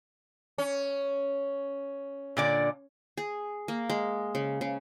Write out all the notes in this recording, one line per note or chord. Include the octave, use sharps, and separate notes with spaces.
C#4
A#2 D3 D5
G#4
A#3
G#3
C#3
C#3